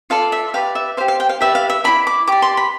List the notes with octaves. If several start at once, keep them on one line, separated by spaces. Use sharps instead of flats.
F4 A4 D5 F5
E5
G4 B4 D5 F5
E5
G4 C5 F5
F5
G5
F5
G4 B4 D5 E5
F5
E5
E4 G4 D5 B5
D6
G4 D5 D6
C6
B5